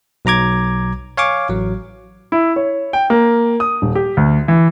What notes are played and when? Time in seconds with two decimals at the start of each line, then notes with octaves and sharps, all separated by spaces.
0.25 B1 F#3 A#5 D6 G#6
1.17 C#5 F5 G#5 C#6 D6
1.49 A1 F#3
2.32 E4
2.56 C#5
2.93 G5
3.10 A#3
3.60 D#6
3.82 D#1
3.95 G4
4.17 D2
4.48 E3